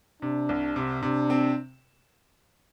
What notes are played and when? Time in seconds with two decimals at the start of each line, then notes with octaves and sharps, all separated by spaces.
0.22 C3 D4
0.49 C2
0.76 C3
1.03 C3 D4
1.30 C4